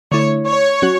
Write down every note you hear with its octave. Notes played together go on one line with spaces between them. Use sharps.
D3 A3 E4 C#5
C#5
F#3 C#4 F#4